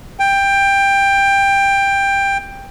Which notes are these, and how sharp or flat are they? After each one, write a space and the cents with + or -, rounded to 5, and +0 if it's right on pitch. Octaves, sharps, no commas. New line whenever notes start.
G5 +15